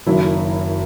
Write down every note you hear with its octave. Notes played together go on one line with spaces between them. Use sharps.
F#1 F#2 D#3 E4